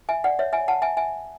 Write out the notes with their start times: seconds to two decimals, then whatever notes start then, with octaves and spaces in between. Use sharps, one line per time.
0.09 E5 G#5
0.24 D5 F#5
0.39 C#5 E5
0.53 E5 G#5
0.68 F#5 A5
0.82 E5 G#5
0.97 E5 G#5